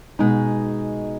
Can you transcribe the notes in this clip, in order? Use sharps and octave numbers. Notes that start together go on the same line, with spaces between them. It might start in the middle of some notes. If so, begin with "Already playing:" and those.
B2 G#3 D#4